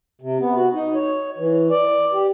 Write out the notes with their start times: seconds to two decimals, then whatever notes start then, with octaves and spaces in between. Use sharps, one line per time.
0.21 C3
0.40 B3
0.56 F#4
0.75 D#4
0.95 C#5
1.38 E3
1.71 D5
2.13 G4